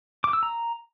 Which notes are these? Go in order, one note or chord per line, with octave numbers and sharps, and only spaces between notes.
D6
E6
A#5